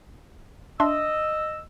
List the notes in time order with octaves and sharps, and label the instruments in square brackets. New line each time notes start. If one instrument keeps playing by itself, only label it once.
[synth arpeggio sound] D4 E5 C6 [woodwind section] D#5 E6